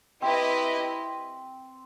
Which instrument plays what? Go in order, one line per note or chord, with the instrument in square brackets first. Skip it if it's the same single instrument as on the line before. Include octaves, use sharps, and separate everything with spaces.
[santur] C4 [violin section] E4 G4 B4 D#5